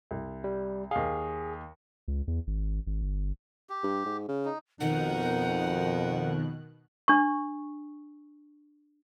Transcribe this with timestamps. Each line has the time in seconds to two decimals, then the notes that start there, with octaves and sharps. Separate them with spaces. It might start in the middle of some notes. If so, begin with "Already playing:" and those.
0.11 C2
0.44 G3
0.91 D#2 G#4 F5
2.08 C#2
2.28 E2
2.47 G#1
2.87 G#1
3.02 G1
3.69 G4
3.83 G2
4.06 G#2
4.29 C#3
4.45 D#4
4.80 F2 B2 D#3 D#4 A#4 F#5 F#6
7.08 D4 C#6